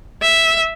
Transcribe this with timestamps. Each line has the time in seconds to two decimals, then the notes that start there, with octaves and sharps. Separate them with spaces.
0.22 E5